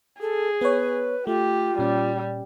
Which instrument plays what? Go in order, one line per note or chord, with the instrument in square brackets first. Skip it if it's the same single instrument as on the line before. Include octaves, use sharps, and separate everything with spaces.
[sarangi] G#4 [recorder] A4
[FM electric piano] B3 C#5 [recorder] B4
[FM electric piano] A3 [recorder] F4 [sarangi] G4
[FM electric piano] A#2 C#4 [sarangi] G3